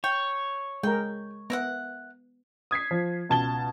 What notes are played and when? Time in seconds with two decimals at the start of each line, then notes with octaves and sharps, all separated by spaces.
0.04 C#5 G5
0.83 G#3 A#4 G5
1.50 B3 A#4 E5 F#5
2.71 D#6 G#6 B6 C7
2.91 F3
3.29 C#2 B2 A5 G#6 G7